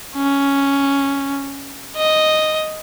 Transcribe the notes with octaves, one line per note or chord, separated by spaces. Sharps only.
C#4
D#5